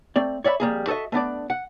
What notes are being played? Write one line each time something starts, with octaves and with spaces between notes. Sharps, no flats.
A3 C4 D5
C#5 D5 E5 F5 B5
F2 G3 A#3 G#4
F#4 A4 C5 D#5 E5
A3 B3 D4 D5
F#5